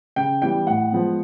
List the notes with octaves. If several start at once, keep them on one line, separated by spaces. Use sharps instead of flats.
C#3 G5
E3 G3 B3 G5
A2 F#5
F3 G#3 B3